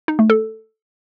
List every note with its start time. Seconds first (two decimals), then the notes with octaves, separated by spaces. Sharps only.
0.08 D#4
0.19 A3
0.30 A4